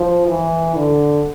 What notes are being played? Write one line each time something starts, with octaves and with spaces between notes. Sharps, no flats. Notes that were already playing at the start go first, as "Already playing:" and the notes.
Already playing: F3
E3
D3